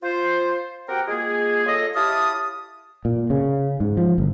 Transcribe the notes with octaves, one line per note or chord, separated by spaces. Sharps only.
F4 C5
C4 F#4 G4 A#4 F#5 G5
G#3 A#3 F4 G#4
F4 A4 C#5 D#5
E4 G4 C#5 F5 A5 D#6
A#2
C#3
G#2
F3
G1